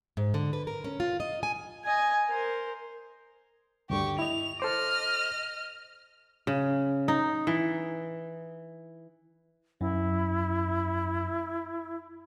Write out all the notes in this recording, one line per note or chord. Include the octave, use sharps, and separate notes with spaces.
G#2
D3
B4
A#4
C#4
F4
D#5
G#5
D#5 G#5
A#4 C5
D2 G2 D3 G4 C#6
E4 D#5 F7
A4 C5 D#5 D6 F6
C#3
D#4
E3
F#2 E4